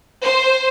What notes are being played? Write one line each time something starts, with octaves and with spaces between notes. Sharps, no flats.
C5